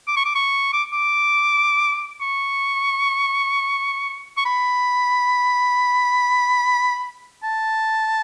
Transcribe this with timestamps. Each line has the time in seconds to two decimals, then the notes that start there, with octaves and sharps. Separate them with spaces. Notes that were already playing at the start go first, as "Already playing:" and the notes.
0.07 D6
0.16 C#6
0.25 D6
0.35 C#6
0.73 D6
0.93 D6
2.21 C#6
4.37 C#6
4.45 B5
7.43 A5